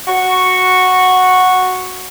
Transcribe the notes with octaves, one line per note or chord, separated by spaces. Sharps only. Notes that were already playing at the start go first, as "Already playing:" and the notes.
F#4 C#6